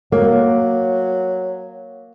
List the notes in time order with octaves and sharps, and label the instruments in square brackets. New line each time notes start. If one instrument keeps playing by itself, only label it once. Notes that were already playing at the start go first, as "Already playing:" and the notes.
[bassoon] F#3 [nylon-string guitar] A#3